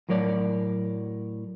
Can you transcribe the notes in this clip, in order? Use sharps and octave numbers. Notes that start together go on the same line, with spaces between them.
A2 F#3 A#4 C#5 D5